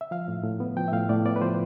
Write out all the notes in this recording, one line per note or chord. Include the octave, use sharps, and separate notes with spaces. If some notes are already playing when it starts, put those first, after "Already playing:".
E5
F3 F5
A2
A2
B3
F3 G5
E5
A2 F5
A2 D5
B3 D5
B4
F3 C5